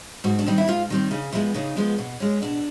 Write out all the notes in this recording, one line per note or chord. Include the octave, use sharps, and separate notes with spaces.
G#2 F#4
D4
D#3 G3 C4 D#4
E4
G#2 F4
D#3 G3 C4
C#3 D#4
F3 G#3 B3 E4
C#3 D#4
F3 G#3 B3
B2
G#3 C#4
B2 D4